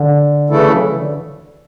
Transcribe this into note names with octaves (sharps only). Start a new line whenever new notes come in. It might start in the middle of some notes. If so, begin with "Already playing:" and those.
Already playing: D3
C#3 E3 A3 E4 A4
F#3
E3
D3